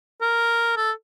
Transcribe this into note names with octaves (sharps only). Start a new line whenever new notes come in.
A#4
A4